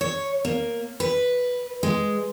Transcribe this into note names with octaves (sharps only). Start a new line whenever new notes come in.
C#5
A#3
B4
G#3